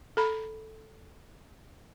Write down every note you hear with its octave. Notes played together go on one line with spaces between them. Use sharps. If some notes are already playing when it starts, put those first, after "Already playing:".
A4 A#5 B5